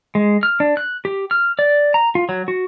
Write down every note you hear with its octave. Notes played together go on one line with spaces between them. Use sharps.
G#3
F6
D4
F#6
G4
F6
D5
A#5
F4
F#3
F#4